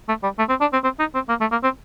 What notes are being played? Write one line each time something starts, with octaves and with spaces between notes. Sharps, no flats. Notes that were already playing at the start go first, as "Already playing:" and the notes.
A3
G3
A3
C4
D4
C4
C4
D#4
C4
A#3
A3
A#3
C4